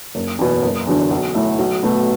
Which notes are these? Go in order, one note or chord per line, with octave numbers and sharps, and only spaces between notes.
F#1
E2 B2
F#1
E2 D3 F#3 D4
B1
A2 A3 E4
B1
B2 A3